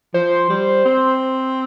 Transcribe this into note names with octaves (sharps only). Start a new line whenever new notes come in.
F3 C5
G3
C4